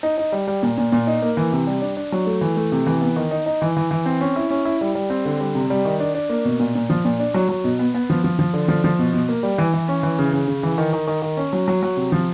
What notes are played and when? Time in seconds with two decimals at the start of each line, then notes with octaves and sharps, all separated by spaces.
0.03 D#4
0.18 D#4
0.32 G3
0.48 G3
0.63 A#2
0.78 A#2
0.92 A#2
1.07 D#4
1.22 A#3
1.37 E3
1.53 C3
1.67 G3
1.82 D4
1.97 D4
2.12 F#3
2.27 A3
2.41 E3
2.57 A3
2.72 C3
2.87 E3
3.02 B3
3.16 D#3
3.31 D#4
3.46 D#4
3.62 E3
3.77 E3
3.91 E3
4.06 C4
4.21 C#4
4.36 E4
4.50 C#4
4.65 E4
4.81 G3
4.95 G3
5.10 C4
5.25 D3
5.40 G3
5.55 C3
5.70 G3
5.85 D#3
6.00 D4
6.15 D4
6.29 A#3
6.45 B2
6.60 A#2
6.75 A#2
6.90 F3
7.05 A#2
7.20 D4
7.34 F#3
7.49 F#3
7.64 B2
7.79 B3
7.94 B3
8.10 F3
8.24 F3
8.39 F3
8.54 D3
8.68 F3
8.84 F3
8.99 B2
9.13 B2
9.29 A#3
9.43 G3
9.58 E3
9.74 E3
9.88 C#4
10.03 E3
10.19 C#3
10.33 C#3
10.48 C#3
10.63 E3
10.78 D#3
10.93 D#3
11.07 D#3
11.22 D#3
11.37 C#4
11.53 F#3
11.68 F#3
11.83 F#3
11.97 C3
12.12 F3